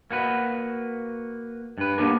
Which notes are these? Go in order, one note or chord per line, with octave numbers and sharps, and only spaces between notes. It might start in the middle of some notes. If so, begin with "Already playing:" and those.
A#3 F#4 B4
G2 B4
A#3 B3 C#4 D4 G4 A#4